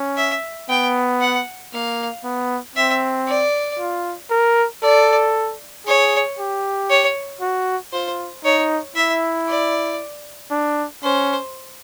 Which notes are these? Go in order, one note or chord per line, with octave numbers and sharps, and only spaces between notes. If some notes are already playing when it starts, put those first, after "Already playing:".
Already playing: C#4
E5
B3 G5
F#5
A#3 F5
B3
C4 E5
D5
F4
A#4
A4 D5
G#4 C#5
G4
C#5
F#4
F4 C5
D#4 C#5
E4 E5
D5
D4
C#4 C5